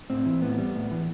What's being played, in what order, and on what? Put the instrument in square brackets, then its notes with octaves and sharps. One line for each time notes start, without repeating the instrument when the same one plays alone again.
[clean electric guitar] A2 C4
E3
A2 B3
G3
A2
E3